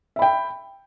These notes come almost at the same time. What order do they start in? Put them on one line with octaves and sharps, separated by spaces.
E5 B5 G5